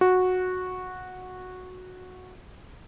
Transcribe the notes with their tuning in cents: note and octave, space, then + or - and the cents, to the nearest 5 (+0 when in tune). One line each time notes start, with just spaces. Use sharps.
F#4 -10